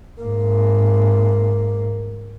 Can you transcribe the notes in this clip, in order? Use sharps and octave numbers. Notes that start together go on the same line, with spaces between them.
G#2 A#3